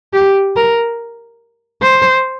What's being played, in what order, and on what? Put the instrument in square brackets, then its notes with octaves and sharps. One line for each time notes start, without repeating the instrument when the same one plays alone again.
[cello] G4
A#4
C5